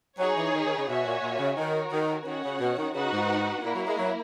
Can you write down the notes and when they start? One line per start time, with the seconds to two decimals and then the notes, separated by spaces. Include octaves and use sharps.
0.18 F#3 D#4 G#4 C#5
0.37 E3
0.54 D#3
0.65 D#3
0.76 C#3
0.87 B2 F#4 C#5 E5 G#5
1.05 A#2
1.22 A#2
1.39 C#3
1.56 D#3 F#4 A#4 C#5
1.91 D#3
2.26 D#3 C#4 F#4 C#5 F#5
2.43 C#3
2.60 B2
2.77 D#3
2.94 C#3 D#4 F#4 B4 F#5
3.12 G#2
3.64 A#2 A#3 E4 A#4
3.74 F#3
3.87 G#3
3.98 F#3